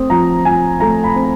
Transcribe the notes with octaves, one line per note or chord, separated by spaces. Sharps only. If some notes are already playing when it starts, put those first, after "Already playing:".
Already playing: A3 C4 D#6
F3 A#5
F3 G#5
A3 A#5
B5
C4